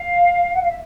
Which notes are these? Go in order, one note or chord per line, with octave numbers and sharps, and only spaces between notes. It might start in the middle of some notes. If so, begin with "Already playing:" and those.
Already playing: F5
F#5
F5
E5